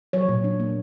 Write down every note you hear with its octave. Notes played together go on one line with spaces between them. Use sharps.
F#3 C#5
A#2
D4
A#3